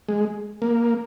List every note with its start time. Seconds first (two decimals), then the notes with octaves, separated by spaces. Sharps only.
0.09 G#3
0.62 A#3